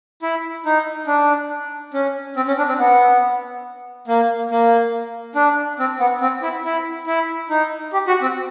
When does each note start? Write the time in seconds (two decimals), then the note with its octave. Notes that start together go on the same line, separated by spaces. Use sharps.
0.22 E4
0.66 D#4
1.07 D4
1.94 C#4
2.36 C4
2.47 C#4
2.58 D4
2.68 C4
2.79 B3
4.08 A#3
4.51 A#3
5.35 D4
5.79 C4
6.00 B3
6.21 C4
6.42 E4
6.65 E4
7.07 E4
7.50 D#4
7.93 G4
8.08 F#4
8.22 C4